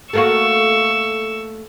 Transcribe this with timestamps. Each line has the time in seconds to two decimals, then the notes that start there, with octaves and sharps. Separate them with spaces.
0.13 A3 A#3 F#4 C#6 E6